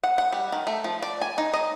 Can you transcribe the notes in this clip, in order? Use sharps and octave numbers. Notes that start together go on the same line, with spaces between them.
F#5
F#5
G3
D#3
A3
F3
D5
G#5
D#4
D#5